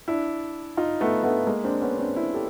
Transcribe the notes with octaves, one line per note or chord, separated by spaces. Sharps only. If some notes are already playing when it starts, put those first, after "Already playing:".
D4 E4
D#4 F4
A3 B3
A3 B3
G#3 A#3
C4 D4
B3 C#4
C4 D4
D4 E4
G4 A4